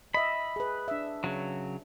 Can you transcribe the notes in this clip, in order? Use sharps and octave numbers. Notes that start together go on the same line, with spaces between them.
D#5 E5 B5
G#4 B4
D4 E5
C#3 F#3